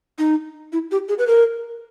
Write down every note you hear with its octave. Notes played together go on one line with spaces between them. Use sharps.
D#4
E4
G4
G#4
B4
A#4